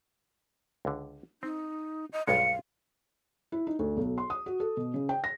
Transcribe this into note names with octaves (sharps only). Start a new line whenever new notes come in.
C#2 D3
C4 D#4
D#5
B1 G2 G#3 F5 C#7
E4
D#4
D2
B1
C6
D#6
F#4
A4
B2
C#3
G5
A#6